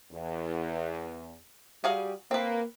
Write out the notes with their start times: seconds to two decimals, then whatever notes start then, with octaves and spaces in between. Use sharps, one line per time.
0.12 E2
1.84 G3 F#4 G#4 F5
2.31 A#3 C4 B4